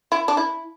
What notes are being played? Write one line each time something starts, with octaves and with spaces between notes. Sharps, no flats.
E4
D4
E4